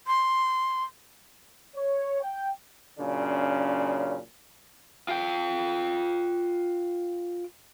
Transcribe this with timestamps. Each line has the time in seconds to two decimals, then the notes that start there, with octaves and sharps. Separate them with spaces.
0.07 C6
1.75 C#5
2.21 G5
2.99 F#2 A#2 C#3 C#4 D4
5.08 F4 G5